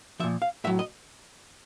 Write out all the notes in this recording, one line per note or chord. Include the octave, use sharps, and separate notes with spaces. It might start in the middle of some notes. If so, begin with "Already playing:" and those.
A#2 F3 E5
F5
A2 F#3 E5
D#5